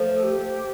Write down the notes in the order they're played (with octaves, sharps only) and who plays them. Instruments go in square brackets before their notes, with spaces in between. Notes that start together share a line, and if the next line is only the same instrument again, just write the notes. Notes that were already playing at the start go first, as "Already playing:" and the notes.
Already playing: [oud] F3 A3
[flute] A4
G4